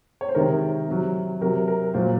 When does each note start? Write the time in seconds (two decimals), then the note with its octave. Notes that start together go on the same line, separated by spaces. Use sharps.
0.21 C#5
0.29 C5
0.35 C3 D#3 G#3 A#4
0.88 C3 F#3
1.41 C3 F#3 A#4
1.68 A#4
1.94 A#2 F#3 C5